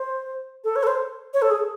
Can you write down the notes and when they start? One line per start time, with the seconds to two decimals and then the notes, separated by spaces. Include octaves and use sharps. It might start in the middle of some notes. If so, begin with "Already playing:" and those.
Already playing: C5
0.64 A4
0.76 C#5
0.83 A4
0.87 C5
1.34 C#5
1.42 A4
1.51 G#4